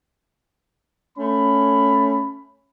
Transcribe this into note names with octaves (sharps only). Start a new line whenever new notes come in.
A3 C#4 B5